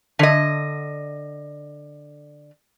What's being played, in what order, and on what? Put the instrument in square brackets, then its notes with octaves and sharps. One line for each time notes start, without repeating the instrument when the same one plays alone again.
[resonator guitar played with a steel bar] D3 D#5